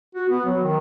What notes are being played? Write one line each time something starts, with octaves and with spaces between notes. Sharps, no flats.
F#4
B3
F#3
D#3